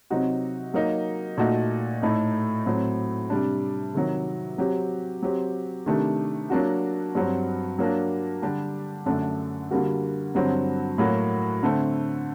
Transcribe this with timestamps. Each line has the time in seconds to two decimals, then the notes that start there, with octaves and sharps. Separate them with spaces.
0.10 C3 F#3 C4 D#4 F#4
0.74 F#3 A#3 D#4
1.37 A#2 A3 D#4 F#4
2.02 A2 A3 D#4
2.66 A2 F#3 C4
3.30 C3 G3 D4
3.94 C3 D#3 F#3
4.58 F#3 C4 G4
5.22 F#3 C4 G4
5.86 C3 D#3 A3 D4 G4
6.50 F#3 A#3 D4 F#4
7.15 G2 F#3 C4
7.78 F#3 A#3 D4
8.42 D3 G3 D4 G4
9.06 F#2 D3 A3 D4
9.71 D3 G3 A#3 F#4
10.35 G2 D3 F#3 C4 F#4
10.98 A2 F#3 A#3 F#4
11.63 D3 A3 C4